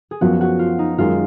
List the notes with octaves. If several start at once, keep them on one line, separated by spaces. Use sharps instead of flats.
G#4
F#2 F3 B3 F#4
F#4
F4
D#4
F#2 D#3 G#3 F4